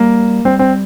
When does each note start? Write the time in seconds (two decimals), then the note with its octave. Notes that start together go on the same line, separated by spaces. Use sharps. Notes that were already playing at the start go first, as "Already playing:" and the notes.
Already playing: G3 A#3
0.45 G3 C4
0.59 C4